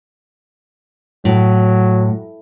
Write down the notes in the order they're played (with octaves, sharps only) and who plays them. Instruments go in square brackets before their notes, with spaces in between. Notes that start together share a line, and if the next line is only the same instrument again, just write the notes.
[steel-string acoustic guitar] A2 [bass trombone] F#3